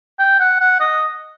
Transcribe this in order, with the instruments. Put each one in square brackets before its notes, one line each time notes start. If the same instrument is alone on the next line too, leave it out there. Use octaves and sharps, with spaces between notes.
[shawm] G5
F#5
F#5
D#5